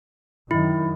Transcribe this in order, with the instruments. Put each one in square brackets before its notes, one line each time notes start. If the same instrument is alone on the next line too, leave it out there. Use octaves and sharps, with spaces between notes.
[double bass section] F#2 D#3 [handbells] E4